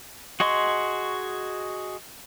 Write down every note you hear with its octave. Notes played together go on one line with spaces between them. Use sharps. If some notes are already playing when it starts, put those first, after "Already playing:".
F#4 G#4 D#5 C6 C#6